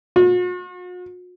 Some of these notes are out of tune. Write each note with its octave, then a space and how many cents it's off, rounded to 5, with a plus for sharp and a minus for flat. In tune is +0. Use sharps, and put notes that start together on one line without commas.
F#4 -45